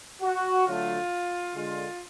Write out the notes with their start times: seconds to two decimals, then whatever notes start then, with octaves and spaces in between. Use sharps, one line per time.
0.22 F#4
0.66 D3 F#3 A3 F4
1.55 D3 G#3 F4